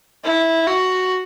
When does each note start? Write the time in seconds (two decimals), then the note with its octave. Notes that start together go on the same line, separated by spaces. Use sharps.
0.25 E4
0.67 F#4